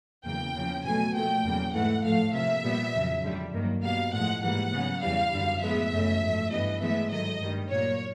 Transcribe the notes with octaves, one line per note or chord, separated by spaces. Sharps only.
E2 C#3 F#3 A#3 G5
E2 C#3 F3 A#3
B2 F#3 A3 G#5
A#2 F3 A3 G5
E2 C#3 F#3 A#3
G#2 E3 A3 F#5
A2 F3 A3 F5
C3 F3 A#3 E5
A#2 G3 B3
F2 C#3 F#3
F2 D3 G3
G2 D#3 F#3 A#3
B2 G3 A#3 F5
A2 F3 G#3 F#5
G#2 E3 G3 A#3 F#5
C#3 F#3 B3
E2 C#3 E3 G3 F5
F#2 D3 G3
A2 F3 G#3 B3 E5
F#2 C#3 E3 A3
G#2 F3 A3
G2 E3 G3 B3 D#5
A2 E3 G#3 B3 E5
G#2 D#3 F#3 A3 D#5
G2 D#3 G3
A#2 F#3 A#3 C#5